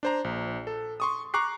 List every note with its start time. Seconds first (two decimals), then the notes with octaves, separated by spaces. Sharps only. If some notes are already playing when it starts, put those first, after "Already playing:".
0.03 D4 C5 A#5
0.24 A#1
0.67 A4
1.00 C6 C#6 D#6
1.34 A#5 C#6 D6 F#6 C7